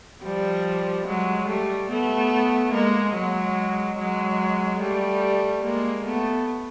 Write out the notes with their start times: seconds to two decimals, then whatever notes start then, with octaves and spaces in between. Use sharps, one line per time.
0.23 F3 G3
1.07 F#3 G#3
1.48 G3 A3
1.90 A3 B3
2.73 G#3 A#3
3.15 F#3 G#3
3.98 F#3 G#3
4.81 G3 A3
5.64 G#3 A#3
6.05 A3 B3